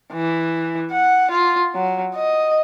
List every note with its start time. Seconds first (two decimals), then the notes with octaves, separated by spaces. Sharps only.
0.13 E3
0.91 F#5
1.31 F4
1.75 F#3
2.15 D#5